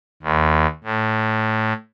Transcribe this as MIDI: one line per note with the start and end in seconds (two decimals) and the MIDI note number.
0.23 0.66 39
0.84 1.73 45